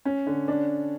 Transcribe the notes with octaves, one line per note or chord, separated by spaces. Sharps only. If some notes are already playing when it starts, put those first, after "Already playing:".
C#4
D3
D4